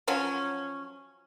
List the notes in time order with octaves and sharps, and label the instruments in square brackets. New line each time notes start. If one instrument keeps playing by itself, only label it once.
[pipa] F3 F#3 C#4